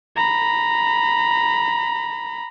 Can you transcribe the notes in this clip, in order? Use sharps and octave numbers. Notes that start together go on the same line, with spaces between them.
A#5 B5